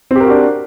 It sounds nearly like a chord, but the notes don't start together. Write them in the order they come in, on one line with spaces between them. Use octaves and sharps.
C4 G4 A#4 F#4 D4